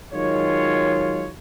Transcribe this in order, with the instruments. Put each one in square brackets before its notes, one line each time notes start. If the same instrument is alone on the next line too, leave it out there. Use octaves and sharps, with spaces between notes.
[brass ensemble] D#3 F#3 G#3 F4 C#5